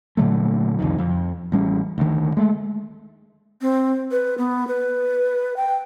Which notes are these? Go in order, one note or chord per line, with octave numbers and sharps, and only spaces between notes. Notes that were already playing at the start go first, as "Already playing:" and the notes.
A#2 D3 F#3 A3
C2 F2 D#3
F2
A1 G3 C#4
D2 D#3
G#3 A3
C4
B4
B3
B4
G5